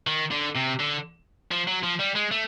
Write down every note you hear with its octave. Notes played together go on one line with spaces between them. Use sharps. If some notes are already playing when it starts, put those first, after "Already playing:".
D#3
D3
C3
D3
F3
F#3
F3
G3
G#3
A3